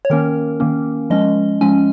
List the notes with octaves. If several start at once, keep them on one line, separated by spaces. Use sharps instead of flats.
C#5
D#3 A#3 C#4 A#4
D#3 A#3 C#4
F3 G#3 C#4 D#5
F3 G#3 C#4 G#5